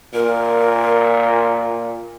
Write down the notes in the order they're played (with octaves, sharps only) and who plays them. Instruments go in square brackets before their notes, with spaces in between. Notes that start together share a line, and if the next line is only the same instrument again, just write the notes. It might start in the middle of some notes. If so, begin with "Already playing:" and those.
[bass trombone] A#2 [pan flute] A#4